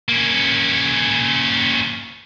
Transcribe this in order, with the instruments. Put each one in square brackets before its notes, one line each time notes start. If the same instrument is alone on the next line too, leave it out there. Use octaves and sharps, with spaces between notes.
[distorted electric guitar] A#3 C#4